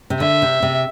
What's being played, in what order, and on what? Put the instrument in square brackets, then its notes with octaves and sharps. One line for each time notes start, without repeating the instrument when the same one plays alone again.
[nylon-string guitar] C3
[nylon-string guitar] D3 [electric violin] E5
[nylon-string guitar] C3
C3